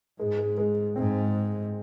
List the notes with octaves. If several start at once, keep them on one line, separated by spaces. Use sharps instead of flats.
G#2 G#3
G#3
G#3
G#2 C4